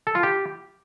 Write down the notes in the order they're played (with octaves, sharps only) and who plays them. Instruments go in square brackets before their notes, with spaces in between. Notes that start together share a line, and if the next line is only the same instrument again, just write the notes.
[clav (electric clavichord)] A4
F4
G4